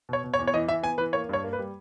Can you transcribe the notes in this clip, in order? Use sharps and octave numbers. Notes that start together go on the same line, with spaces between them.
B2 C#5
B2
C#5
E2
C#5
E3 D#5
E3 E5
B3 G#5
E3 B4
A#3 C#5
G2 C#5
A#3
B4
G3